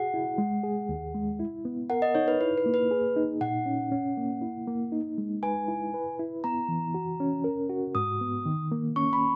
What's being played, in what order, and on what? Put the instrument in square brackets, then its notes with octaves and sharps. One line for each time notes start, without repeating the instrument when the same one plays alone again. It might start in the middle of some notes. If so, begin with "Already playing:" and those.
Already playing: [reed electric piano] F#4 G#4 [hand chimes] F#5
[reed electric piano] E4
G#3
G#4
D#2
G#3
E4
B3
[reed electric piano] A#4 [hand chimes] F#5
[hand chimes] D#5
[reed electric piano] D#4 [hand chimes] C#5
[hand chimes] B4
[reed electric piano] E4 [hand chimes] B4
[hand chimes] B4
[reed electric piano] A#3
[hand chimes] B4
[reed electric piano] G#4
D#4
[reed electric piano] A#2 [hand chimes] F#5
[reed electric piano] C#4
C#4
A#3
E4
A#3
D#4
G#3
[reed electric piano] B4 [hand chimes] G#5
[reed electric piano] E4
B4
E4
[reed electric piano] B3 [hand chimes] A#5
[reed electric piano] E3
F#4
C#4
A#4
F#4
[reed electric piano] G#2 [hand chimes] D#6
[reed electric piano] B3
D#3
A#3
[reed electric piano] C#4 [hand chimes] C#6
[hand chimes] B5